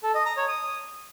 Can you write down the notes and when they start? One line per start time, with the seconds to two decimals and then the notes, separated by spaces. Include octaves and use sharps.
0.03 A4
0.15 D#5
0.26 A#5
0.37 C#5
0.48 D#6